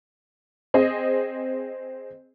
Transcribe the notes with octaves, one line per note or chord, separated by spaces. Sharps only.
C4 G#4 D#5